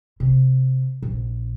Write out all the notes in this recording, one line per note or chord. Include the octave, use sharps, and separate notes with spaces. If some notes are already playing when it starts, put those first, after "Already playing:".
C3
A#1